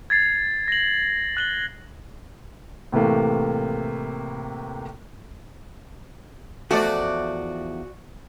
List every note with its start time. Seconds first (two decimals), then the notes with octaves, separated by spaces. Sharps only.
0.10 G#6 A6 C7
0.68 A#6 F#7
1.37 F#6 F#7 G7
2.92 A2 C3 E3 A3 A#3
6.71 E2 F3 A3 F#4 D5